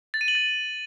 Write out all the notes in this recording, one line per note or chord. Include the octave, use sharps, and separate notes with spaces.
A6
D#7
F#7
A6